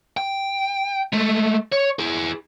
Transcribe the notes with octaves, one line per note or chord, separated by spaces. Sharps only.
G5
G#3 A3
C#5
E4 G#4